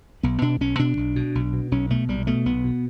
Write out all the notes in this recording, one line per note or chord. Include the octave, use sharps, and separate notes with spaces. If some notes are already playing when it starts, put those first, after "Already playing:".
B1 B3
B2 D4
B1 C#4
B2 D4
B1
B2
B1
B2
B1 C#4
B2 A3
B1 G3
B2 A3
B1 B3
B2